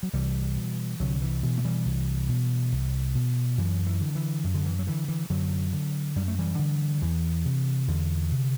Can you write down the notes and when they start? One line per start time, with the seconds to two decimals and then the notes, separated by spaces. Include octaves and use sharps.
0.03 F#3
0.13 C2 E3 G3
0.57 B2
1.00 C2 D3 F#3
1.22 E3
1.43 B2 E3
1.58 A3
1.65 E3 G3
1.86 C2
2.29 B2
2.72 C2
3.15 B2
3.58 F#2 E3
3.87 E3
4.01 D3
4.15 E3
4.44 F#2
4.54 D3
4.66 E3
4.79 F#3
4.87 D3 E3
5.08 E3
5.30 F#2 D3 F#3
5.73 D3
6.16 F#2 G3
6.28 A3
6.39 E3 G3
6.59 D3
7.02 E2 E3
7.45 C3
7.88 E2 D3
8.31 C3